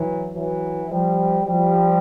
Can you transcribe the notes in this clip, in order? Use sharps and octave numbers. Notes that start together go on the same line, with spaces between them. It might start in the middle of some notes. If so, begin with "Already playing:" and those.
Already playing: E3 F#3
E3 F#3
F3 G3
F3 G3